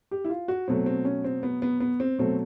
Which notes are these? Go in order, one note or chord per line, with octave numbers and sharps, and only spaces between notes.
G4
E4
F4
F#4
B2 F#3 A3 C4
C4
C#4
C4
B3
B3
B3
C4
B2 F#3 A3 C4